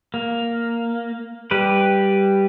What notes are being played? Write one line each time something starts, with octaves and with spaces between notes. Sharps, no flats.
A#3
G3 G4 B4